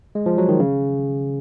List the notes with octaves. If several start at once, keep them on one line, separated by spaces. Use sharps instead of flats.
G#3
F3
F#3
D#3
C#3